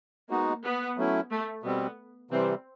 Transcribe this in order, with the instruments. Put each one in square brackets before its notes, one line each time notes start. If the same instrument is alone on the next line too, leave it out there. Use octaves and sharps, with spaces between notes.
[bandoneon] G#3 B3 D#4 F#4 [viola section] A#3
[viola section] B3
[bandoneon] F#3 A3 C#4 E4
[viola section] A3
[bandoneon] B2 G3 C4 [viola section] B3
[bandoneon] C3 E3 G3 [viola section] C4